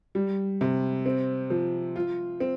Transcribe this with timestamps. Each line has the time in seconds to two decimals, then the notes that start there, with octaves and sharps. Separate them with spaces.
0.15 G3
0.61 C3
1.06 C4
1.50 F3
1.96 F4
2.40 C4